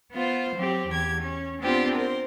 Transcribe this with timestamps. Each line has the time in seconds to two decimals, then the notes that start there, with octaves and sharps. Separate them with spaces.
0.12 B3 F4 C5
0.55 F#3 C4 G4
0.88 E2 G4 G#6
1.22 C#4
1.62 B3 C4 D4 F4 G4 C5
1.95 A#4 C5